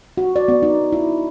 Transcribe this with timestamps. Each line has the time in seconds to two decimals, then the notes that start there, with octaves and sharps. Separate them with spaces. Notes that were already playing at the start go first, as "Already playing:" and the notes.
0.18 F#4
0.36 D5
0.48 B3
0.63 D#4
0.93 E4